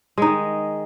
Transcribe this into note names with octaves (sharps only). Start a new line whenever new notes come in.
D#3 G#3 D#4